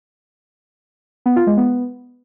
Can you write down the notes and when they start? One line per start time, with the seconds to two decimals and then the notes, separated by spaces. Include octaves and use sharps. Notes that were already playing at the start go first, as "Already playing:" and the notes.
1.26 B3
1.36 F4
1.47 G#3
1.57 B3